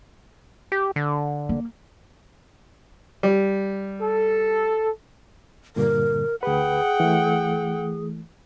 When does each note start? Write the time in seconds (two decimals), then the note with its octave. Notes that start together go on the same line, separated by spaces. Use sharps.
0.72 G4
0.96 D3
1.49 A#3
3.23 G3
4.02 A4
5.76 G2 A#2 D3 A#4
6.43 D2 G#4 B4 F#5 G5
7.00 E3 A3